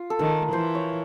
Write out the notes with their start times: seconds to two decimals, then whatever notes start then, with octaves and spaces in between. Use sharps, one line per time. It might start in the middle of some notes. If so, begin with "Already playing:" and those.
Already playing: F4
0.10 A4
0.19 D#3 A#4
0.52 E3 C5
0.75 C#5